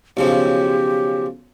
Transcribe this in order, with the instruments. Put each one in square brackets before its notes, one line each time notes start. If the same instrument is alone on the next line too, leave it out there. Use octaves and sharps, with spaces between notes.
[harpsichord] B1 C#3 F3 [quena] G4